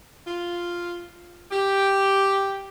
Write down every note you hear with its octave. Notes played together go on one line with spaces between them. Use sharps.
F4
G4